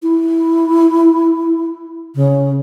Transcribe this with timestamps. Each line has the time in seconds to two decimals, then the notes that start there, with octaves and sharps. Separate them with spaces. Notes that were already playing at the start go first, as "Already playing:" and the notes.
0.03 E4
2.15 C#3